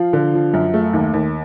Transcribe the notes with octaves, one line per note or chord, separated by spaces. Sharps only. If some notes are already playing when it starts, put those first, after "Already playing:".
Already playing: F3 F5
D3
F3
F#2
A3
D#2
D#2